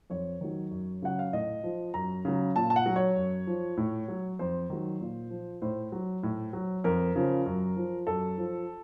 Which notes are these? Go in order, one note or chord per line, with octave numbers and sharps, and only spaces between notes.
F2 C#5
D#3 F#3
F#2
C#3 F#3 F#5
F5
A2 D#5
F3
F#2 A#5
C#3 F#3
A#2 A5
A5
F#5
F#3
C#5
F#2
F3
A2
F#3
F2 C5
D#3 F#3
A#2
F3
A2 C5
F#3
A2
F#3
F2 A#4
C#3 F3
F#2
F3
F#2 A4
F3